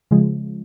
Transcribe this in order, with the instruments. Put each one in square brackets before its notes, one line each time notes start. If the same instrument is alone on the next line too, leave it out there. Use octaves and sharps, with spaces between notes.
[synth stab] C#3 F3 G#3